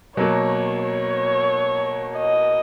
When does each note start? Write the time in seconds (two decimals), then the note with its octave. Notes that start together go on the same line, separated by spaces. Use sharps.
0.17 B2 F#3 A#3 C#5
0.84 C#5
2.18 D#5